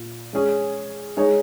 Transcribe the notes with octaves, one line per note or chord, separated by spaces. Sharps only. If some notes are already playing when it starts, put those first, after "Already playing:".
Already playing: A#2
G#3 C#4 G#4
G#3 D#4 G#4 C#5